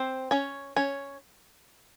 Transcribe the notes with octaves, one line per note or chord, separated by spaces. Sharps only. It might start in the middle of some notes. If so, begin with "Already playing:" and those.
Already playing: C4 C5
C#4 C#5
C#4 C#5